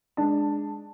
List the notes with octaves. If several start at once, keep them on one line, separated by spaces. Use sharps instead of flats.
G#3 D4 A5